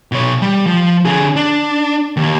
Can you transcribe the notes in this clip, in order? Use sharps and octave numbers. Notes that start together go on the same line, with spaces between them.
B2 C#5
G3
F3
D3 G#4
D4
D#2